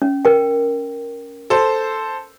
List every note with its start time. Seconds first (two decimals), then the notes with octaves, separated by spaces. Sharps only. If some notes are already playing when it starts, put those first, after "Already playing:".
0.02 C#4
0.25 A#4 G5
1.50 A4 C5